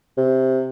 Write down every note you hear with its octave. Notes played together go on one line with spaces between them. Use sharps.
C3